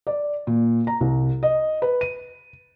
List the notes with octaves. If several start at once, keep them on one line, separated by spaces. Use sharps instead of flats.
D5
A#2
A#5
C2
D#5
B4
D#7